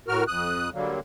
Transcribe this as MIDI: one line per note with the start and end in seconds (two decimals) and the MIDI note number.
0.08 0.24 45
0.08 0.24 66
0.08 0.24 70
0.08 0.24 89
0.27 0.70 41
0.27 0.70 87
0.27 0.70 90
0.73 1.00 50
0.73 1.00 54
0.73 1.00 55
0.73 1.00 58